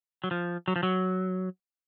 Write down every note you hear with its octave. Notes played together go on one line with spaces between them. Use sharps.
F#3
F3
F#3
F3
F#3